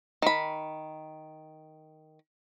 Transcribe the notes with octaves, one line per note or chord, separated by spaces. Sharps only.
D#3 B5